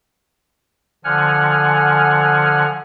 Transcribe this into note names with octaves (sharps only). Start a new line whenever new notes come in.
D3 F3 F#5 G#5 F6